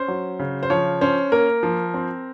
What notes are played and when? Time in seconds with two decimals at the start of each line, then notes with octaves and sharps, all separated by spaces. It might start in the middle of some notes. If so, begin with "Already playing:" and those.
Already playing: C#4 C5
0.08 F#3
0.39 C#3
0.63 C5
0.70 F3 C#5
1.01 C#4 C5
1.32 A#3 A#4
1.63 F3
1.94 C4